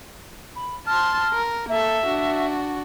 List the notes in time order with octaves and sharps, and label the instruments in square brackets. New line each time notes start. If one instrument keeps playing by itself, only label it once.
[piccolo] B5
[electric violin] A5 C6 [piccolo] F6
[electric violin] A#4
[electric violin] A#3 A4 [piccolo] E5
[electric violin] D4 F#4